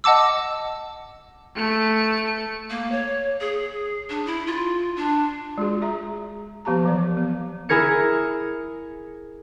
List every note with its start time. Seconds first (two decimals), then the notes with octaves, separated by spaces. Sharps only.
0.04 D#5 F#5 A5 D6 E6
1.56 A3 C#7
2.70 A#3
2.92 C#5
3.41 G#4
4.10 D4
4.26 E4
4.47 F4
4.96 D4
5.58 G#3 F4 F#4 G#4
5.82 G#4 E5 A#5
6.65 F3 B3 G4 A5 A#5
6.84 E3 F#3 D5
7.17 B3
7.69 E4 G#4 A#4 G#6 C#7